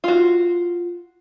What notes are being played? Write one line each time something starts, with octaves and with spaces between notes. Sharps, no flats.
F4 F#4